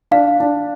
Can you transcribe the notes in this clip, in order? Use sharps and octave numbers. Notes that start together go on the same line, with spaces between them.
D4 F5
D4